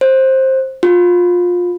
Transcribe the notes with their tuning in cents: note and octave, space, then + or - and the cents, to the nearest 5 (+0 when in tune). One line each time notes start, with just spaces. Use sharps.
C5 +15
F4 +20